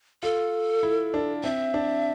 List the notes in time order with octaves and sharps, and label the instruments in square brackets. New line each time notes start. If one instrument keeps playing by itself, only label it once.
[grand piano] F4 [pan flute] A4
[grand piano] E4
D4
[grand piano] C4 [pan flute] E5
[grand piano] D4